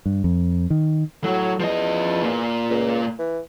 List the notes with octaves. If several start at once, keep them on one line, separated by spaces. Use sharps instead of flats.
G2
F2
D#3
A2 F#3
E2 F3 D#5
A#2 A#3
C#2
E3